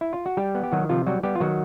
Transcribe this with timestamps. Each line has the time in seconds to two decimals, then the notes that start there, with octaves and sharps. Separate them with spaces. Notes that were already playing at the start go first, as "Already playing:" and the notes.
0.01 E4
0.13 F4
0.26 F#4
0.37 G3 G4
0.55 B3
0.63 G4
0.72 D#3 F#3 F#4
0.89 C3 F3 F4
1.06 F#3 G3 F#4
1.23 G3 B3 G4
1.35 F4
1.40 D#3 F#3 F#4